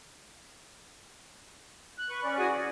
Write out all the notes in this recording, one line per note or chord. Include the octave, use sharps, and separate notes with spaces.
F#6
B4 C#6
C#4 D5
E3 F#4 G#4 F#5 G#5
D5